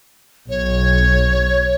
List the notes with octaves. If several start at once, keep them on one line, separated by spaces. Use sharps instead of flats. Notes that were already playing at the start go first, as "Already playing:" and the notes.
B1 C#5